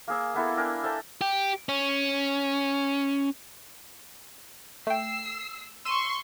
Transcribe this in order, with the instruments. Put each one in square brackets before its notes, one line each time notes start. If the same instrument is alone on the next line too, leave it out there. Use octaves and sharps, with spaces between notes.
[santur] A#3 G#4 E6
A#3 B3 E4 A4
D4 A#4 G5 G#5
A4 E5 G5 A5
[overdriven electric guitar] G4
C#4
[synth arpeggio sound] A3 G5 [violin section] E6 C7
[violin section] C6 C#6 [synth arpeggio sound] E6 D#7 E7